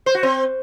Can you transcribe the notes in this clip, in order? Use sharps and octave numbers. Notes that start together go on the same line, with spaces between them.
C5
F#4
C4